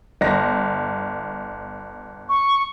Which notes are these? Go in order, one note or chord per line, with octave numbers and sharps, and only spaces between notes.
G1 A#6
C#6